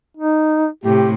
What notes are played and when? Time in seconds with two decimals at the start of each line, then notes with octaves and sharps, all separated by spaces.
0.17 D#4
0.84 A2 C3 G4